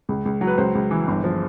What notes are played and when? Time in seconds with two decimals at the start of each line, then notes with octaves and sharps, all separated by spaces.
0.09 C#2
0.26 C#2
0.41 F#3
0.47 B4
0.58 C#2 C5
0.75 C#2
0.91 E3
1.07 G1
1.24 F3